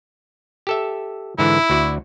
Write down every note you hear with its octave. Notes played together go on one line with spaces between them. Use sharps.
G4 A4 E5
G#2 D3 E3 E4
D2 F#4 D5